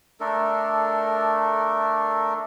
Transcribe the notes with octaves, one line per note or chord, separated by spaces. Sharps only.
A3 D4 A4 A#4